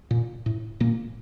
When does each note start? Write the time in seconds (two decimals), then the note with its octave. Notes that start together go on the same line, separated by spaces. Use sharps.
0.11 A#2
0.46 A2
0.80 A#2 A#3